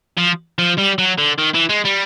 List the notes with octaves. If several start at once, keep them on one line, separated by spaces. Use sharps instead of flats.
F3
F3
G3
F#3
D3
D#3
E3
G#3
G3